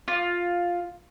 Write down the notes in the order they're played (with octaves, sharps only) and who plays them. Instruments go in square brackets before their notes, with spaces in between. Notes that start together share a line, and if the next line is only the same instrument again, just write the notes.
[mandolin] F4